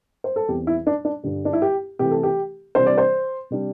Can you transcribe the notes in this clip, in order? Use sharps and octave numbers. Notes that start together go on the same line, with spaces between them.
C5
A4
E2 E3 C4 G4
E4
D4
D4
G2 D3 G3
D4
E4
G4
C3 E3 A3 G4
A4
G4
C3 E3 G3 D4 C5
D5
C5
C3 G3 D4